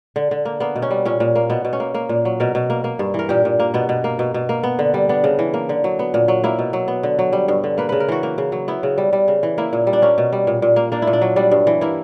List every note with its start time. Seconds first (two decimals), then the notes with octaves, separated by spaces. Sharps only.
0.16 D3
0.31 D3
0.45 A#3
0.60 A#3 B3
0.75 B2
0.82 C#4
0.91 G3
1.05 A#2 C#4
1.20 A#2
1.35 A#3
1.50 B2 B3
1.65 B2
1.73 C#4
1.80 A#3
1.94 A#3
2.09 A#2
2.25 F#3
2.40 B2 A#4
2.55 B2
2.70 A#3
2.84 A#3
2.99 G2
3.14 E3 A#4
3.29 A#2 G4
3.45 A#2
3.60 A#3
3.74 B2 B3
3.89 B2
4.04 A#3
4.19 B2
4.34 B2
4.49 A#3
4.63 B3
4.79 D3
4.94 G3
5.09 B3 D4
5.24 C#3
5.39 E3
5.54 A#3
5.69 D3
5.84 F#3
5.99 B3
6.14 A#2
6.28 F#3
6.44 A#3 E4
6.59 B2
6.73 F#3
6.88 B3
7.03 D3
7.19 F#3
7.33 G3
7.48 G2
7.64 D3
7.78 A#3 B4
7.89 C#3 B4
8.00 A#4
8.08 E3 F#4
8.23 A#3
8.38 C#3
8.52 F#3
8.68 B3 E4
8.83 C#3
8.98 G3
9.13 G3
9.28 C#3
9.43 E3
9.58 A#3 E4
9.73 A#2
9.87 G3
9.93 D4
10.02 A#3 C#4
10.18 B2
10.33 G3
10.47 A#2
10.62 A#2
10.76 A#3
10.92 A#3 D4
11.02 E4
11.07 A#2
11.13 D4
11.22 F#3
11.36 G3 D4
11.51 G2
11.67 E3
11.81 A#3 E4